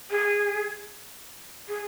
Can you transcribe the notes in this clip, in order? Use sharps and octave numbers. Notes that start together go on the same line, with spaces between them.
G#4
G#4